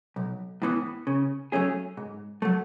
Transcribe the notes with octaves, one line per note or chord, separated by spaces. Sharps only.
B1
A2 E3 B3
C#3
F#3 A3 C#4 G#4
G#2
F#3 A3